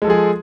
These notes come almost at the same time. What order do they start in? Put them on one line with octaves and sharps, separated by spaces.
G#3 A4 F3 G#4